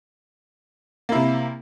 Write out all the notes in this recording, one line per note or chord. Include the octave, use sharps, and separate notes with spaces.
C3 A#3 E4